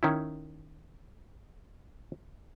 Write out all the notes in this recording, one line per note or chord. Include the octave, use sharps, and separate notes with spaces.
D#3 C#4 E4